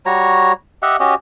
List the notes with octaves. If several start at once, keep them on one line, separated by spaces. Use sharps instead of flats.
G3 F#4 C#5 A#5
G4 D#5 E5 F#5
C#4 F#4 G4 D#5